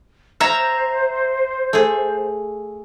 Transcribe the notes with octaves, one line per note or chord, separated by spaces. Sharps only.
C5 C#5 E5 F5 A#5
A3 G#4